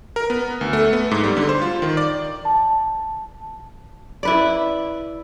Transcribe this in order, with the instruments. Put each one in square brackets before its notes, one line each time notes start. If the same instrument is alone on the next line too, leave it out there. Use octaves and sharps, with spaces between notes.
[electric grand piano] A#4
B3
D2
A3
B3
G#2
G3
D3
C5
F4
D#3
D5
[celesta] A5
[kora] E4 B4 D5